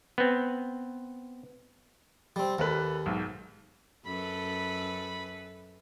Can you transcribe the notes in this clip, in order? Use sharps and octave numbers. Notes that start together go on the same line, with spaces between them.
B3 C4
G3 C4
D#2 A#3 A4 B4
B1 G#2
F#2 A4 B4 B5